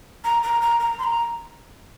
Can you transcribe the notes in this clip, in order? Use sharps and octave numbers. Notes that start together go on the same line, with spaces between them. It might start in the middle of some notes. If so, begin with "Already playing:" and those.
A#5
A#5
A#5
A#5
C6
A#5